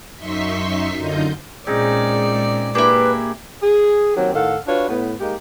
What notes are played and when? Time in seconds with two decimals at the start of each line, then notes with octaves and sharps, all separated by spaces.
0.16 F#2 D#4 E5 C6 C#6 B6
0.98 F#2 D3 D#4 F4 D#5 G6
1.67 A#2 G#3 C4 C#4 D#4 G#4 D5
2.75 A#3 D4 E4 G4 G#4 B4
3.62 G#4
4.16 D#3 F#3 A#3 C4 G4
4.34 A2 D#3 A4 F5 F#5
4.67 D4 F4 F#4 B4 C#5
4.88 A2 B3
5.20 G#3 A#3 D#4 G4